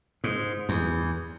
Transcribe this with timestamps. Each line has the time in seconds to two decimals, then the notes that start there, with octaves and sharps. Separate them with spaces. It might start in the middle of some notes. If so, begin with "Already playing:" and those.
0.24 G#2
0.69 E2